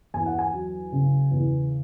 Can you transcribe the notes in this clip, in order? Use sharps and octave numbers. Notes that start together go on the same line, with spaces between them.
E2 G#5
F#5
G#5
F#3
C#3
E2